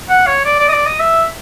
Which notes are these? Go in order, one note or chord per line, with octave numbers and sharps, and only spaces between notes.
F#5
C#5
D5
D5
D#5
D5
D#5
E5